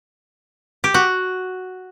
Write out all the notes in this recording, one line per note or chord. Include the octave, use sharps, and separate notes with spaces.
G4
F#4